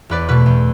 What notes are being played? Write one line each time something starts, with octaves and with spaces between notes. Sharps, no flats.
E2 B4 D5
B2 A3 B4
E2